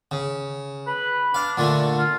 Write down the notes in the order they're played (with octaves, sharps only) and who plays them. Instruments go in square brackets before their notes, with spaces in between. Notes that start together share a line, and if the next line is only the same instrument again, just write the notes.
[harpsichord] C#3
[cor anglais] B4
[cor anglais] D4 [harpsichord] F5
[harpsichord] A#2 D3 A3
[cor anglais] F4